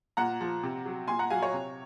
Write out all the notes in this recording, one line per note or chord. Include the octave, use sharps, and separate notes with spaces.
A#2 F#5 A#5
F3
C3
F#3
A#2 G#5 C6
F#5 A#5
F#3 F5 G#5
C#5
C3